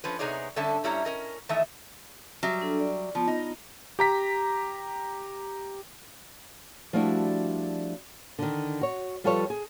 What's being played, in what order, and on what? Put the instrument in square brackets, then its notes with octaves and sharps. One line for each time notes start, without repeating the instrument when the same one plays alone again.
[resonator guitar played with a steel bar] F3 C#4 B4
C3 B3 D#4 G#4 C#5 D5
D3 G3 C#4 A4 E5 A5
G2 G3 C#4 E4 C#5 A#5
C#4 A#4 D#5
D#3 E3 A3 A4 D#5 E5
F#3 G3 E5
[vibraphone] D4 A4
D5
[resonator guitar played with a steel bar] F3 [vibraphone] B3 F4
[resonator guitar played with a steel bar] D#4
[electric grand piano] G4 A#5 B6
[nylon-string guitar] F3 G3 A3 D4 E4 F#4
D3 D#3
F#4 C#5
F3 G3 F4 A4 B4 C#5
G#4